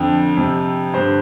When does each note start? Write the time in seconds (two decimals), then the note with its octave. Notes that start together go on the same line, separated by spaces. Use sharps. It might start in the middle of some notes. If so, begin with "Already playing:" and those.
Already playing: F2 D3 G5
0.37 F2 C3
0.93 G2 D3 C5